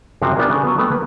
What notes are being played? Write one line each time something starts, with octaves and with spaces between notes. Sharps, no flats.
F#2 C3 F3 F#4 F5
B3 D4 F4 G4 A#4 G#5
C#3 A4
F#3 B3
A3 B3 A4 B4 F5 G5
A#3 B4